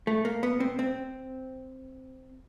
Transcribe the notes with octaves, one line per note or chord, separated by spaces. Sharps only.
A3
A#3
B3
C4
C4